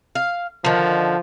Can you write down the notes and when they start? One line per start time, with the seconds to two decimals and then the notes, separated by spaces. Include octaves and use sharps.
0.15 F5
0.64 D3 D#3 F3